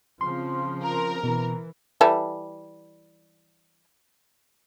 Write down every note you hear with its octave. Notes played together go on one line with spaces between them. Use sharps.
C#3 F3 C4 C6
A#4
B2 E3
E3 G3 A4